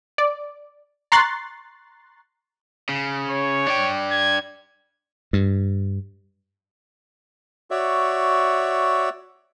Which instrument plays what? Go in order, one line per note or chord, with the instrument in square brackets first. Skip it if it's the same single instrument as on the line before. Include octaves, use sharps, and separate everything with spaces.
[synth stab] D5
A#5 C6 C#6 F#6 A6 C7
[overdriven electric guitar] C#3
[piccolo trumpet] C#5
[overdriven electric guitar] D4 G5
[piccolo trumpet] G#6
[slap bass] G2
[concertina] F#4 C#5 D5 E5